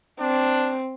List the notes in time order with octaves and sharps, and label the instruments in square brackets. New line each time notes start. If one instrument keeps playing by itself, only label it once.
[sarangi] C4 [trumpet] D4